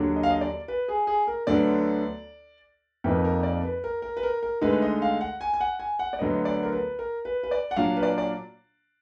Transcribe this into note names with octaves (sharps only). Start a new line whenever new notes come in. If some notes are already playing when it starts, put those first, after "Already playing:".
Already playing: D#2 D3 F#3 D4
D#5
F5
D#5
D5
B4
G#4
G#4
A#4
D2 D3 F#3 B3 D4 D5
F2 F3 A#3 D#4 B4
A#4
D5
B4
A#4
A#4
B4
A#4
A#4
D2 D3 G#3 D#4 B4
D#5
F5
F#5
G#5
G#5
F#5
G#5
F#5
D5
D2 D3 F#3 B3 D#5
D5
A#4
B4
A#4
B4
B4
D5
F#5
A#2 F#3 D4 F4 F5
B4
D5
D5